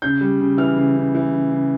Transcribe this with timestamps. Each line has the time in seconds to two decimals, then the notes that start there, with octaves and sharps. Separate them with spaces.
0.02 C#3 G6
0.21 G3
0.39 C#3
0.58 E3 F6
0.76 C#3
0.96 C#3
1.15 E3
1.33 C#3
1.51 C#3